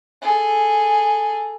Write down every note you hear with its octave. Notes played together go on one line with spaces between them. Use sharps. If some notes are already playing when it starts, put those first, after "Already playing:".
G#4 A4